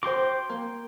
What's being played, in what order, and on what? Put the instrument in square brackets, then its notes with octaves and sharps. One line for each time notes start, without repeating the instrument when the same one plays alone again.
[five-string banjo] F#4 C5 [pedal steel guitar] G5 C6 D6
[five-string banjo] A#3